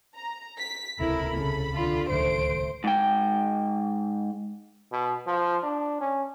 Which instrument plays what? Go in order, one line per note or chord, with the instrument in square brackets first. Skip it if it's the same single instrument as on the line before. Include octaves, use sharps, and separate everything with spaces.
[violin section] A#5
B6
[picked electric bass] D#1 C#2 C3 [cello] E4 A#4 [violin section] A4 B5
[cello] C#3
D3 F4
[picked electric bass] D1 C#2 D#3 [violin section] A3 D7 [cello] C5
[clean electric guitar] G#2 G5
[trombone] B2
F3
D4
C#4